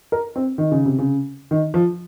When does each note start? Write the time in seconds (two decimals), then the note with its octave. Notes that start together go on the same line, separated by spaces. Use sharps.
0.12 A#4
0.36 C4
0.58 D#3
0.72 C#3
0.86 C3
0.99 C#3
1.51 D#3
1.74 F3